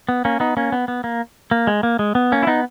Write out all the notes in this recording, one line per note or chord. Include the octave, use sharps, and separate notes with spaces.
B3
A#3 C#4
B3 D#4
A#3 C#4
B3
B3
A#3
A#3
G#3
A#3
G#3
B3
A#3 C#4
E4
B3 D#4